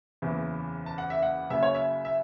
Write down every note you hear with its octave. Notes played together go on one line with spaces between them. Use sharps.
F#1 E2 C#3 E3
A5
F#5
E5
F#5
F#1 F#2 C#3 E5
C#5
E5
E5